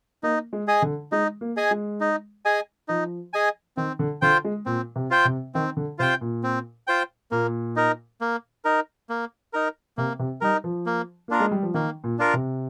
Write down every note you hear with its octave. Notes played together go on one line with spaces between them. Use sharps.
A#3 D#4
G#3
G#4 D#5 G#5
D3
G#3 D#4
A#3
G#4 D#5 G#5
G#3
D#4
G#4 D#5 G#5
F3 D#4
G#4 D#5 G#5
D#3 C4
D3
D3 F4 C5 G5
G#3
A#2 C4
C3
F4 C5 G5
C3
D#3 C4
D3
C3 F4 C5 G5
A#2
C4
F4 C5 G5
A#2 A#3
D#4 A#4
A#3
D#4 A#4
A#3
D#4 A#4
C3 A#3
C3
G3 D#4 A#4
F3
A#3
A#3 D4 F4 A#4
G#3
G3
F3
D#3 A#3
A#2
D4 F4 A#4
C3